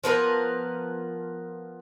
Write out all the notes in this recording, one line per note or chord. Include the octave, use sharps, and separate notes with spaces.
F3 B3 A#4 B4